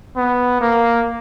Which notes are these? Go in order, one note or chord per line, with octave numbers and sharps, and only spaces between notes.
B3
A#3